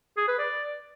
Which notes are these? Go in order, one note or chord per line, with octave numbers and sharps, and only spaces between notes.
G#4
B4
D5